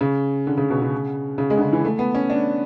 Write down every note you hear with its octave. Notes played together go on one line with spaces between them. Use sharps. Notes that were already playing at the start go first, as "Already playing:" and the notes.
C#3
D3
C#3
B2
C#3
C#3
G#3
D3
C#3
E3
A3
B3
C#4
D4